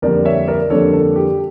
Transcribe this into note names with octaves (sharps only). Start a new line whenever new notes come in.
F2 D3 G3 A#3 D4 A#4 D5
C#5 E5
A#4 D5
F2 D3 G3 A#3 D4 A4 C#5
A4
G4